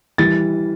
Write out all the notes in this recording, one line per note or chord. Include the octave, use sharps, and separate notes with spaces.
E3 G3 A6